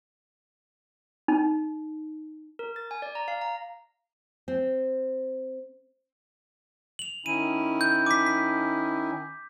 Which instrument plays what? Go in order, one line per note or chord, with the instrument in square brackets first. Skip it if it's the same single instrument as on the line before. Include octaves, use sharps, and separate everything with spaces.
[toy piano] D#4
[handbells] A#4
A6
G#5
D5
A#5
F5
A#5
[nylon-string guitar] C4
[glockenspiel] F7 F#7
[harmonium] D#3 C#4 E4 [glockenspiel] D#7
[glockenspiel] G6
D6 B6
B6